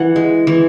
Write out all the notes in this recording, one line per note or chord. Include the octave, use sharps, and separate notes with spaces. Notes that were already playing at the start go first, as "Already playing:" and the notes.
Already playing: E3 F#5
G#3
E3